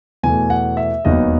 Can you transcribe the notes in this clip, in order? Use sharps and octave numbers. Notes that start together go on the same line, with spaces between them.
E2 B2 A3 G#5
F#5
E5
E1 D#2 D#3 F#3 B3 D#5